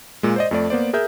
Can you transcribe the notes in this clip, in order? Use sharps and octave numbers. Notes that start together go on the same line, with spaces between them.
A#2 G#3
C5 D5 D#5
F2 A3 D5
A#3 B3 C5 D5
G#4 A#4 E5 G6